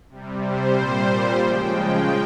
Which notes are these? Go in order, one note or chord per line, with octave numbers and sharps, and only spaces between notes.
C3 G3
C5
A#2 G3
C#3 F3 G#3 G5
G5